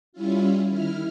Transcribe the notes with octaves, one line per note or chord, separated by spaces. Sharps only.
G3 C#4 E4 F4
D#3 E4 F6